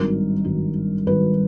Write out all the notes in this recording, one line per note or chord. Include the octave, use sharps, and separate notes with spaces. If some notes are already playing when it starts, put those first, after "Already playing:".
Already playing: G#1 G2 D#3 F#3 A#4
G#1 G2 D#3 F#3
G#1 G2 D#3 F#3 B4